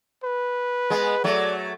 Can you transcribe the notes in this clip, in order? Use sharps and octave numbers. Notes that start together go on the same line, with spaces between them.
B4
G#3 B3
F#3 A3 D5